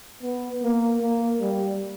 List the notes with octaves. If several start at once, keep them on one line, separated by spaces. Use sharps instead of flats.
B3
A#3
A#3
G3